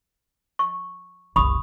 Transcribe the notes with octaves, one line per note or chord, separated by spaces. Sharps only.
C#6
F#1 C2 B5 C#6 D#6